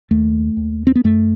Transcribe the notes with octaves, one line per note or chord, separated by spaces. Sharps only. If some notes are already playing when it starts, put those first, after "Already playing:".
D#2 A3
D#2
C4
B3
F#2 A3